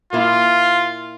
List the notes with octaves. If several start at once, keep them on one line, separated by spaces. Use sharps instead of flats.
A#2 E4 F4